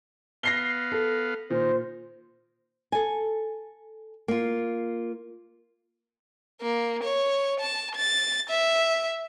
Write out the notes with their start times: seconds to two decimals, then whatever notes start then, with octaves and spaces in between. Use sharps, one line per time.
0.43 B3 F5 A#6 C7 G7
0.92 A4
1.50 A#2 D#3 C5
2.92 A4 G#5
4.28 A#3 F4
6.61 A#3
7.04 C#5
7.60 A5
7.96 A6
8.50 E5